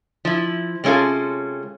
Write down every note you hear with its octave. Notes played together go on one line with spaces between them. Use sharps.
F3 E4
C3 G#3 C#4 F4 A4